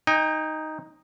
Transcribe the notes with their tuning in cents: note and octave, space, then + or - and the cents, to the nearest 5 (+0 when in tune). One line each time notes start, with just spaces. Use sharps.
D#4 +0 G5 +40